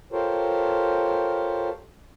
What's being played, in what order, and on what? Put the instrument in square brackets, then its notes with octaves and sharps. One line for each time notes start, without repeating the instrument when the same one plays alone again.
[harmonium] F4 G4 A4 A#4 C5 C#5